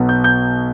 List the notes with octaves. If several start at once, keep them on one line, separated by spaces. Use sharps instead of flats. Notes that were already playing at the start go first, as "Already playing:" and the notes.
Already playing: B1 B2 F#3 B3
G6
G6